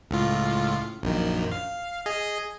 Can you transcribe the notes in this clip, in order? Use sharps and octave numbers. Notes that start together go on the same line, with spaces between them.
C#2 A2 F4
A#1 F#2 D#3
F5
G#4 D#5